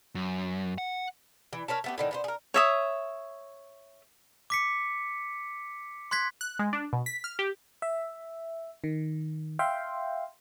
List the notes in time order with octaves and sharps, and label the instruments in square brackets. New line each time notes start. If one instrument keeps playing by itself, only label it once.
[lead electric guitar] F#2
F#5
[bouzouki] E3
A#4 B4 C#5 A5
A3 B3 G4
A2 D3 D#3
B3 D4 C5
G#4 A#4
[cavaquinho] C#5 E5 D#6
[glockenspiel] D6 B6 C#7
C6 F#6 G#6 B6
[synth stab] F#6
G#3
D4
B2
B6
F6
G4
[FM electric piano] E5
D#3
E5 F5 G5 C6